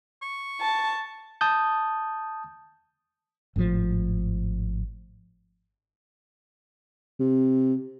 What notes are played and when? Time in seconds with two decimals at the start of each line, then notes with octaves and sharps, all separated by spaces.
0.22 C#6
0.61 A5
1.41 A5 D#6 G6
3.56 G#1 A2 C3 F3
7.20 C3